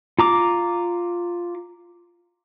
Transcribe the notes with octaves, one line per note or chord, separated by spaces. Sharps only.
F4 A#5 D6